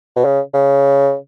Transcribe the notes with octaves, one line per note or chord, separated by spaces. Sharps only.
B2
C#3
C#3